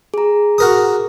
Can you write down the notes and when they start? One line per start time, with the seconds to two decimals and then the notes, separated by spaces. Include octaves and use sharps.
0.14 G#4 A#5
0.58 F#4 A#4 D#6